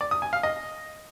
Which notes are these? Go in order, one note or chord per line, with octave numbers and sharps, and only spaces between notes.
D5
D#6
G#5
F5
D#5